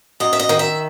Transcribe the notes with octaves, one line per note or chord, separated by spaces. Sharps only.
F#2 D#5
E5
D#5
D#3
E5